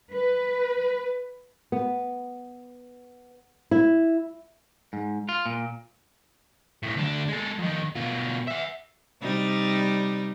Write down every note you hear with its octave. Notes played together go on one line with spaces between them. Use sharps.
B4
B3
E4
G#2
F4
A#2
B1 A2
D2 D4
G#3 A4
F2 D#3
B2 F4
E5 F#5
C3 G3 D#4